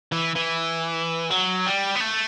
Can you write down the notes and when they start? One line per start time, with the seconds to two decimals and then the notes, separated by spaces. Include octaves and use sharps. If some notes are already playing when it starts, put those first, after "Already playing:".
0.12 E3
0.36 E3
1.30 F#3
1.66 G3
1.95 B3
2.00 A3